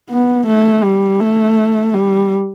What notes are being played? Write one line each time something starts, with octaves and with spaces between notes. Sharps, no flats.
B3
A3
G3
A3
G3